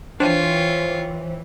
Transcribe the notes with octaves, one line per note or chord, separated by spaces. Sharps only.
E3 D4 F4 C5 C#5 G5